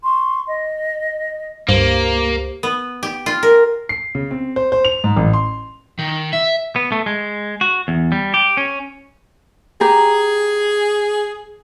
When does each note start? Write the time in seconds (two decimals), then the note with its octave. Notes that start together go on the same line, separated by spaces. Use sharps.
0.04 C6 C#6
0.47 D#5
1.69 C#2 G2 A#3 G4 C5
2.63 B3
3.03 G4
3.26 F4
3.43 A#4
3.89 C7
4.15 C#3
4.31 C4
4.56 C5
4.72 C5
4.85 F7
5.04 G#2
5.17 A1
5.33 C6
5.99 D#3
6.33 E5
6.76 B3
6.92 A3
7.06 G#3
7.61 F#4
7.88 E2
8.12 G3
8.34 G4
8.57 C#4
9.81 G4 G#4 A#5